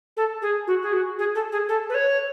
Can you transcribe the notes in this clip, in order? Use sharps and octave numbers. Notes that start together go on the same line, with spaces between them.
A4
G#4
F#4
G#4
F#4
G#4
A4
G#4
A4
B4
C#5